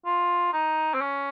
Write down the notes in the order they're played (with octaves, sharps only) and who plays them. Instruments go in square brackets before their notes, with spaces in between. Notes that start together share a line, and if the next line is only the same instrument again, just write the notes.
[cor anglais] F4
D#4
C4
C#4